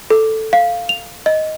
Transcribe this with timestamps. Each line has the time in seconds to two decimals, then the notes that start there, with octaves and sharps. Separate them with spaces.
0.10 A4
0.53 F5
0.89 F7
1.26 D#5